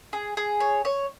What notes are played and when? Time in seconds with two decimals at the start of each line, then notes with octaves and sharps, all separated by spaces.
0.13 G#4
0.37 G#4
0.60 C#5
0.85 C#5